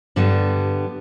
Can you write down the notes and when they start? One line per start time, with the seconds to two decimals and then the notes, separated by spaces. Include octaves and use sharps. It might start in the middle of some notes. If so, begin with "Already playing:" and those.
0.16 G2 D3 G3 B3